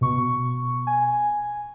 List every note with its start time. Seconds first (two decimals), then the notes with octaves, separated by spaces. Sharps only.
0.01 B2 C#6
0.87 G#5